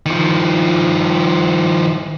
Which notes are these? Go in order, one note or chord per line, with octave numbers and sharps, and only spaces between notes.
D#3 F3